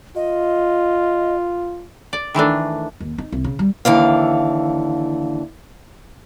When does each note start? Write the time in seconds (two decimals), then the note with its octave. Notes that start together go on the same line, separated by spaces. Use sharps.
0.16 F4 D#5
2.13 D5
2.34 D#3 E3 A3 D4
3.00 D#2
3.18 D#4
3.32 C2
3.44 C#3
3.59 G3
3.85 D#2 D3 E3 F5